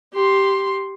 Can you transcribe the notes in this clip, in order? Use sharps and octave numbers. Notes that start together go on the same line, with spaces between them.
G4 C6